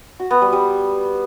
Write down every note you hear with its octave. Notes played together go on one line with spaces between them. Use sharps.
F#4
B3
G3
G3